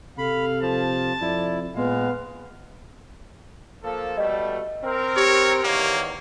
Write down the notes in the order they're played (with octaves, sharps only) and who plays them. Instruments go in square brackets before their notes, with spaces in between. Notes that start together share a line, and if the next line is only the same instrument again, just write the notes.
[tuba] C3 [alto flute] A4 [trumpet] F5 [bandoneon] B5
[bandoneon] F3 [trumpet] A5
[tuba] F2 [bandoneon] E4 [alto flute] D5
[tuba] A#2 [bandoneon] G#3 [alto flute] B3 [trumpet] F5
[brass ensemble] F3 A#3 A4
[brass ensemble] B2 G3 A3 [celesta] D#5
[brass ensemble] C4 A#4
[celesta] G4 [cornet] C#5
[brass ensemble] E2 D#3 C#5 [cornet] A#3